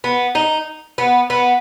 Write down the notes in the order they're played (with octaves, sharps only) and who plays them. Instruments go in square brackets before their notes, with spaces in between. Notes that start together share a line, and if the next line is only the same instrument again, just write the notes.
[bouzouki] B3
D#4
B3
B3